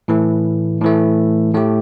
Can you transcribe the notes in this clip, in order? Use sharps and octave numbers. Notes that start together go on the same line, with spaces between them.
A2 E3 A3
A2 E3 A3
A2 A3 G4